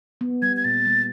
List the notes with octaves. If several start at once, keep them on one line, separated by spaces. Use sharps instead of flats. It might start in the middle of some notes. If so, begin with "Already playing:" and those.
B3
G3 G#6
G#6
A#2 A6
G3